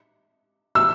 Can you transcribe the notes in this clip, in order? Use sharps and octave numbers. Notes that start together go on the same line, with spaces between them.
E6